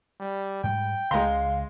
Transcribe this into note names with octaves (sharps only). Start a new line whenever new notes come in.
G3
G#2 G3 G#3 G5
C#2 C#3 G#3 F5 A#5 C6